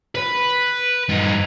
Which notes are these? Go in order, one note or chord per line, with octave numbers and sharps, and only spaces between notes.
B4
G2 D#4